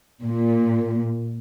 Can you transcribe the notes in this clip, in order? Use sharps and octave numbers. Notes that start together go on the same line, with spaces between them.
A#2